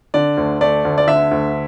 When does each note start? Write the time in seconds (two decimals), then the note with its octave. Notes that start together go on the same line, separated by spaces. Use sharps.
0.14 D3 D5
0.37 D2
0.61 A3 D5
0.85 D2
0.98 D5
1.07 D3 E5
1.31 D2